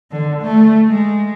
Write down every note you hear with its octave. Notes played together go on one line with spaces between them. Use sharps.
D3
A3
G#3